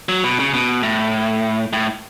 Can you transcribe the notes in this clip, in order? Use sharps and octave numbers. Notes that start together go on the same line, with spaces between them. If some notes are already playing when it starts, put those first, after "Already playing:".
F#3
B2
C#3
B2
A2
A2